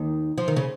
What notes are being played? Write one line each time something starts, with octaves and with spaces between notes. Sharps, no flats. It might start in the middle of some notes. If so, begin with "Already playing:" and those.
Already playing: D#2 D#3
F3
D#3
C#3